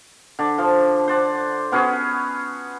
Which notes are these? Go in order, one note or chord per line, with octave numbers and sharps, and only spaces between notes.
D3 D5
F3
C5 D5 F#5
B3 C#4 F#4 G#4